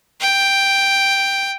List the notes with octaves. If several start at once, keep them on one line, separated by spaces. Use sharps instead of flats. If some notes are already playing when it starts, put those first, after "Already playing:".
G5